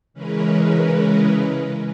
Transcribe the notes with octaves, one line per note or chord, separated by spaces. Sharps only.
C#3 E3 G#3 C#4 A#4 B4